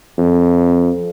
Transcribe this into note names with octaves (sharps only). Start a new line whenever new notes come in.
F2